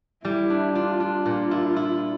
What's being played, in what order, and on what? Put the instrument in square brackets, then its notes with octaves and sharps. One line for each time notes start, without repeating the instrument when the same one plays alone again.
[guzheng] G3 [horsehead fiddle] E4
[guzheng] D4
[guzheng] D4 [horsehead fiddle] F4
[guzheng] D4
[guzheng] A#2 [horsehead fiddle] F4
[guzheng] E4
E4